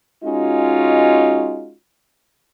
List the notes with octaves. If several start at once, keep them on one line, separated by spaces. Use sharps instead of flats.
G#3 C#4 D#4 F4 F#4